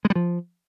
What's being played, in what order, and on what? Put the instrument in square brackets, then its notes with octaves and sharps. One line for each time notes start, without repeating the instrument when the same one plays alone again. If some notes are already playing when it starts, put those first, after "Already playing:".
[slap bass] G#3
G3
F3